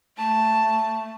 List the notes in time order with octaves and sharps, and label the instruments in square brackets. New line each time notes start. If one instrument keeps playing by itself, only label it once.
[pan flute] A3 [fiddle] A5